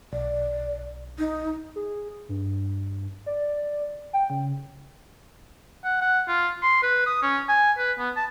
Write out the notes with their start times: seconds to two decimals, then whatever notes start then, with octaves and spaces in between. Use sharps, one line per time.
0.13 B1 D5
1.19 D#4
1.76 G#4
2.29 G2
3.26 D5
4.13 G5
4.30 C#3
5.84 F#5
6.01 F#5
6.28 F4
6.63 C6
6.83 B4
7.07 D#6
7.22 C#4
7.49 G#5
7.78 B4
7.99 B3
8.16 A5